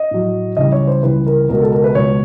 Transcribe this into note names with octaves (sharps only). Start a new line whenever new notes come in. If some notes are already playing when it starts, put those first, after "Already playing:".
Already playing: D#5
A2 F#3
C#2 C#3 E3 G3 D#5
C#5
C5
C#2 C#3 E3 G3 B4
A#4
C#2 B2 G#3 A#4
A4
A#4
B4
C#2 B2 G#3 C#5